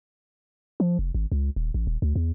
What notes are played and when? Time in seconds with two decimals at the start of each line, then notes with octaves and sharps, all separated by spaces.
0.80 F3
0.99 F1
1.15 G#1
1.32 C#2
1.56 D#1
1.74 A1
1.87 D#1
2.02 D2
2.16 E2